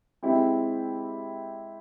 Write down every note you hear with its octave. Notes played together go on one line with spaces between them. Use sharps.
G#3 C4 E4 G4